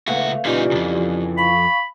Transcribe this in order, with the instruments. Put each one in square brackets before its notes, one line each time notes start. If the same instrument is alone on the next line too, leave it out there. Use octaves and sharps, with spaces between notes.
[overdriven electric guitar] C#2 F#4 [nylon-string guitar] A3 B3 [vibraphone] F5
[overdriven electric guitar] A#2 D#4 [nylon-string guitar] C#3 E3 [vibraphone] F4 G4 D5
[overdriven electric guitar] B1 F2
[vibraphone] F5 C#6 [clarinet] B5